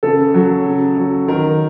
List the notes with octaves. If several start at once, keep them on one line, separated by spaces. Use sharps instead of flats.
C#3 A4
F#3
C#3
F#3
D#3 A#4